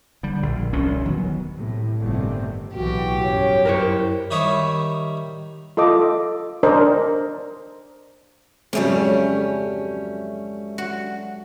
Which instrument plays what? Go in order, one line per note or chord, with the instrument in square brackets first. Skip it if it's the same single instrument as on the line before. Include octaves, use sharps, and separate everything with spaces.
[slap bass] D3 G3
A#1
E1 C2 B2 C#4
D#3 F#3 B3
[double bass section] A2 C3
G1 C3 D#3 A3 C4
[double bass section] B1 A2 E3 [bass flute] F#4 [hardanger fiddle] G4
[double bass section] G1 F#2 [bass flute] C#5
[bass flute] E4 [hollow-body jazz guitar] A#4 C5 C#5
[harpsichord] D#3 G3 C#5 E5 B5 D#6
[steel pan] F4 A4 D#5 D6
D4 A#4 C5 D5 D#5
[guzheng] F2 C#3 [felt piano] G#2 F#3 [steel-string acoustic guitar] G3 A3 C#4
[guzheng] F#4